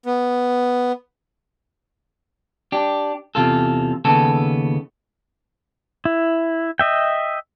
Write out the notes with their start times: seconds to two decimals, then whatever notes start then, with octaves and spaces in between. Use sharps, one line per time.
0.06 B3
2.72 D4 G4
3.35 E2 C3 F4 A4
4.05 D#2 C#3 B3 A4 A5
6.05 E4
6.79 D#5 E5 G5